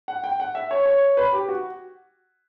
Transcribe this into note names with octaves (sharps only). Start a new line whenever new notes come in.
F#5
G5
F#5
E5
C#5
C#5
B4
G4
F#4